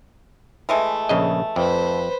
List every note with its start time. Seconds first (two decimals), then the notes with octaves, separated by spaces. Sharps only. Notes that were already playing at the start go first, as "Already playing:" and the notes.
0.69 E3 G#3 A3
1.09 A#1 C#3 D#5
1.56 F2 B4 C5